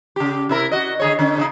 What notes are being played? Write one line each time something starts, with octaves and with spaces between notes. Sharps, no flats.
C#3 G4
C3 E4 A#4
F#4 D#5
D3 G#4 C#5
D3 C#4
C#3 D4 D#4